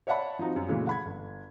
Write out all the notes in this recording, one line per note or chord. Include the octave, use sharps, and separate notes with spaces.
C#5 D5 E5 F#5 A5 B5
F3 C4 D#4 F#4
F#2 G3
A#2 C#3 E3 F#3 G#3 A3
F#5 B5 G#6
G1